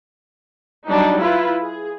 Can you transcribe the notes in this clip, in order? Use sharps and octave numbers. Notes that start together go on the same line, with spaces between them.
F#3 G3 D4 D#4
E4 F4 B4
G#4